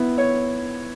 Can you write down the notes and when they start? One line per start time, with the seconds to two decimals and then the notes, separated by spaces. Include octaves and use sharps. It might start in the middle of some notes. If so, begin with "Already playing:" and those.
Already playing: B3 E4
0.18 C#5